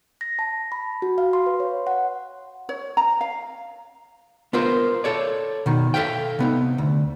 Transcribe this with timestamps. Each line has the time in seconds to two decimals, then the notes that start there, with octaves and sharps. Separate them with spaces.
0.21 A#6
0.39 A5
0.72 B5
1.02 F#4
1.18 F5
1.33 C6
1.46 B4
1.60 C#5
1.87 F#5
2.69 C#5
2.97 A#5
3.21 F5
4.53 B3 F4 A#4 C5
5.04 A4 C#5 D5
5.66 B2 D#3
5.94 A4 A#4 E5 F5 G5
6.39 C3 B3 D#4
6.78 D2